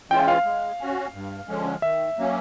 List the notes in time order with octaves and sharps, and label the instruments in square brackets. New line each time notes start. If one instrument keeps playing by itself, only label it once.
[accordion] E3 G#3 C#4 F4 [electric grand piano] G5
[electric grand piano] F5
[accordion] G#3
C#4 F#4
G2
D3 F3 G#3 C#4
[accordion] D#3 [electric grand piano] E5
[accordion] F#3 A#3 C#4